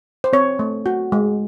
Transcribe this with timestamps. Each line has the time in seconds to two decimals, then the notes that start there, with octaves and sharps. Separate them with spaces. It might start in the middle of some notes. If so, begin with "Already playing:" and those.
0.24 C5
0.33 C4 C#5
0.59 A3
0.86 F#4
1.12 G#3